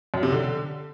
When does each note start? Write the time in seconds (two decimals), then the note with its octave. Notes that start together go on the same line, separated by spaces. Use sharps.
0.14 F#2
0.23 C3
0.32 D3